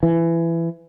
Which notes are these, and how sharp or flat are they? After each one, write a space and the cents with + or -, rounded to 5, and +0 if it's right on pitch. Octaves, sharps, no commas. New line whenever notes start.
E3 +20